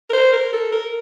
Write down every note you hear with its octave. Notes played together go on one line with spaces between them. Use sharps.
A#4
C5
A#4
A4
A#4